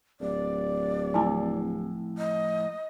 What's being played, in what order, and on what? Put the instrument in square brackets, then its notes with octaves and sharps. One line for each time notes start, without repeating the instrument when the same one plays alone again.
[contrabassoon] D1 [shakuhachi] D5
[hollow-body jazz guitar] F2 A2 [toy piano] E4 G#5
[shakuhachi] D#5